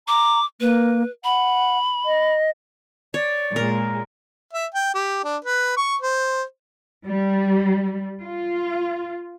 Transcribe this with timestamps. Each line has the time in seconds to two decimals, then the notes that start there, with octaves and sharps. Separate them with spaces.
0.08 A#5 D6
0.61 A#3 B4
1.24 F#5 B5
2.05 D#5
3.14 C#5 D5
3.56 A#2 G#3 A#4
4.53 E5
4.75 G5
4.95 G4
5.24 D4
5.45 B4
5.77 C#6
6.01 C5
7.06 G3
8.22 F4